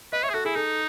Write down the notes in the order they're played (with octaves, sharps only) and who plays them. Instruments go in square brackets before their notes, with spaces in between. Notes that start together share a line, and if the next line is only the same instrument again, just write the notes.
[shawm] B4 [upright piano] D#5
[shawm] C#5 [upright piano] E5
[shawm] G#4
[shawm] F#4 [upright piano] A4
[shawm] E4 [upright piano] G#4
[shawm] D#4 [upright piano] A4